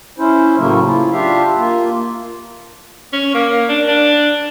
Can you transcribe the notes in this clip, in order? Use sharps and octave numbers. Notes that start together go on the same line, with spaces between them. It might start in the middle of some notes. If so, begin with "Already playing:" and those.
C#4 E4 C5
A2 C#3 F#3 A3 A#3
E4 F4
D4 F4 G4 E5 F5
A#3 F4
C#4
A#3
D4
D4